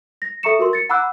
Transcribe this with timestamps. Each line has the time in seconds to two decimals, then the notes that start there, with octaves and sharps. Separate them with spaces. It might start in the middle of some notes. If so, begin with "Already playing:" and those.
0.22 A#6
0.43 A4 E5 A#5 C#6 C#7 E7
0.59 F#4 A#4 C6
0.73 A6 C#7
0.89 F#5 A#5 B5 D6 E6 F#6